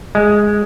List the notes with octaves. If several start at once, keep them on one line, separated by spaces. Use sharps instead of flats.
G#3